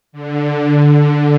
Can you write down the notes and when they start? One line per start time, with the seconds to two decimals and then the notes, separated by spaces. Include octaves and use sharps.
0.12 D3